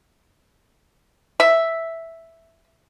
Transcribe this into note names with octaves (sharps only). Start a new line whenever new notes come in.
E5